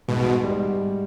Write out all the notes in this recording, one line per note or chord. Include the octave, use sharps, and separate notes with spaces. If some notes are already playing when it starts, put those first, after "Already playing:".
G#2 B2
G#2
G3